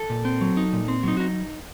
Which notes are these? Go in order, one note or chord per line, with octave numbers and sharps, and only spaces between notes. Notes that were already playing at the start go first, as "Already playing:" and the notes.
Already playing: A4
A#2
C4
F#3
D#4
A#2
C4
F#3 D#4
D#4 F#4